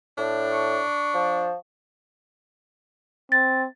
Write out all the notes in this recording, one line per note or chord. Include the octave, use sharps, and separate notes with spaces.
A2 D4
C#6
F3
C4 A6